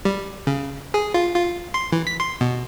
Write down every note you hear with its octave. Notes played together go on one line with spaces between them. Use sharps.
G3
C#3
G#4
F4
F4
C6
E3
B6
C6
B2